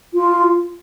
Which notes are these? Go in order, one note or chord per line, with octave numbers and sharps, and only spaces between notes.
F4